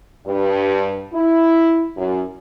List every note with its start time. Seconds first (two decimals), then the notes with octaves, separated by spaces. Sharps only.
0.26 G2
1.13 E4
1.97 F#2